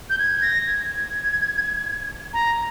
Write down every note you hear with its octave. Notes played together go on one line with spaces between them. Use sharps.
G6
G#6
A#6
G#6
G#6
A#5